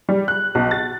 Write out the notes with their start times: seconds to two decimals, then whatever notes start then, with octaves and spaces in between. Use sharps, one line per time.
0.09 G3
0.28 F#6
0.55 B1
0.71 A6